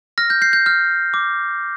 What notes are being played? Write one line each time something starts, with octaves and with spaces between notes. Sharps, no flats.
F6 A#6
G6
G6 C7
G6
F6
D6